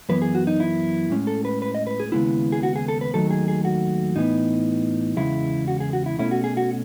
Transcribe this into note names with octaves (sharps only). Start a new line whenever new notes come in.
F#2 E3 B3 B4
G#4
F#4
D#4
E4
A2 G#3 C#4
A4
B4
B4
D#5
B4
G#4
D#2 C#3 G#3 B3 E4
G#4
F#4
G#4
A4
B4
D#2 D#3 F#3 A3 A4
G#4
G#4
F#4
A2 E3 B3 D#4
E2 C#3 G#3 E4
F#4
G#4
F#4
E4
B2 A3 C#4 E4
F#4
G#4
F#4